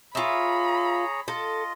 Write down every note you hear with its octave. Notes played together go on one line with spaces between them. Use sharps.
F4 G#4 C#5 E5 A#5 B5
F4 A4 D#5